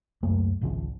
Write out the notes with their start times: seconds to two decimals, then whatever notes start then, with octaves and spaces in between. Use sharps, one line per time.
0.23 C#2 F#2 A3 A#3
0.61 G#1 C#2 C#3 F3